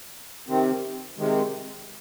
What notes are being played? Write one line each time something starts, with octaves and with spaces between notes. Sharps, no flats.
C3 D#3 C4
C3 D#3 G#3